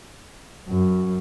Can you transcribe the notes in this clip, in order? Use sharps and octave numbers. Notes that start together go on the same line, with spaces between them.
F#2